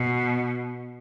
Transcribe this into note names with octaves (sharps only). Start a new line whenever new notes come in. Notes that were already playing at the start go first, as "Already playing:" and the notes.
Already playing: B2